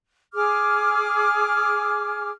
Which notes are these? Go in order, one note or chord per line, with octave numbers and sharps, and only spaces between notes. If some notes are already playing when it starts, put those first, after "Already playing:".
G#4 D6 F6